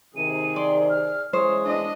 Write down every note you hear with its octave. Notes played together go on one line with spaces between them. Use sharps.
C3 D#3 G#4 D#7
D5 C6
F6
C#3 E3 G#3 C5 C#5 D#6
D4 D#5